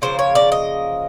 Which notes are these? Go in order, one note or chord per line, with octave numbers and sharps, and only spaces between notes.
C#3 F3 A#3 C5
C#5
D5
D#5